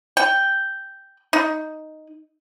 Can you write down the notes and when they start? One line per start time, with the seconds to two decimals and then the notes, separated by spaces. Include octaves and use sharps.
0.17 G5
1.33 D#4